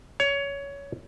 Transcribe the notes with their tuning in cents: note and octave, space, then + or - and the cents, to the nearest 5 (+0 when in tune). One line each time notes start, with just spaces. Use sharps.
C#5 +20